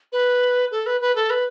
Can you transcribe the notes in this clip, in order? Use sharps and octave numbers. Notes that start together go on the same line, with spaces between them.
B4
A4
B4
B4
A4
B4